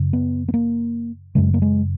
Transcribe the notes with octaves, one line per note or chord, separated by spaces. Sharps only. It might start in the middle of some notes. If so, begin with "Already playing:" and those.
Already playing: F#2 C#3
B3
B3
A#3
F#2 C#3 G#3
A#3
G#3